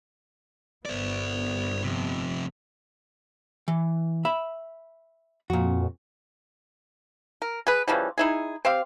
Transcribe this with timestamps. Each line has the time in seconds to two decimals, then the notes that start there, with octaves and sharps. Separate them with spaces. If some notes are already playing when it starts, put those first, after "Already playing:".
0.85 G1 G2 B3 C5 D5
1.84 F2 C3
3.68 E3
4.25 E5 B5
5.50 F2 A#2 F#4
7.42 A#4
7.67 G#4 B4
7.88 C#3 E3 F3 G3
8.18 D#4 E4 G#4
8.65 C4 G4 F5